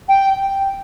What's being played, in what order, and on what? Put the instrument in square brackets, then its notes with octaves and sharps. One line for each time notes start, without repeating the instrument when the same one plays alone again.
[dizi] G5